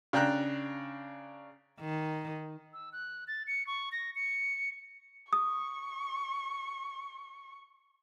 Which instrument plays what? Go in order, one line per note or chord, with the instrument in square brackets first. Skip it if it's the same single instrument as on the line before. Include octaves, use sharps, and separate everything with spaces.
[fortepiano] C#3 D4 G5 A#5 F#6
[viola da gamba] D#3
[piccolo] E6
F#6
A6
C#7
C#6
A#6
C#7
[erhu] C#6 [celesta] D#6